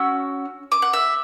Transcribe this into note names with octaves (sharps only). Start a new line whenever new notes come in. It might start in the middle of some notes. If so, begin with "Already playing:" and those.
Already playing: C#4 F#4 E6
D6
F#5
E5